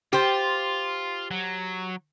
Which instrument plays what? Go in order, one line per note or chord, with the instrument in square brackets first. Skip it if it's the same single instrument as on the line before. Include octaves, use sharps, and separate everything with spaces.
[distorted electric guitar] F4 [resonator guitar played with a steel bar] G4 C5
[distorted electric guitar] F#3